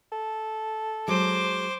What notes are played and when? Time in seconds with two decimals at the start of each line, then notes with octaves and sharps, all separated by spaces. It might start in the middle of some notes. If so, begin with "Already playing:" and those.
0.12 A4
1.08 F#3 G#3 C5 D6